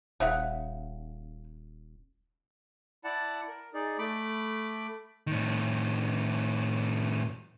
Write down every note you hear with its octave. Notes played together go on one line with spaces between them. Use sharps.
D#1 C#3 E5 F#5
E4 D5 F#5 A5
A#4
D#4 G#4 D5
A3 B5 D6
A2 D#3